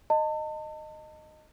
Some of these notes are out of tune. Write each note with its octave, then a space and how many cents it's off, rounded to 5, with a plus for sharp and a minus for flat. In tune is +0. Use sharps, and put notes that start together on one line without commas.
D#5 -10 A5 +35